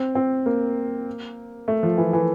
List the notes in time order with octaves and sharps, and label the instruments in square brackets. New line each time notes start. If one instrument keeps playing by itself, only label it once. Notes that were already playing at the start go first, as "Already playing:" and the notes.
Already playing: [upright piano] C4
C4
A#3
A3
F3
E3
E3